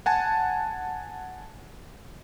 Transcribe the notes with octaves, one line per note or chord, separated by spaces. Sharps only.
F#5 G#5 A5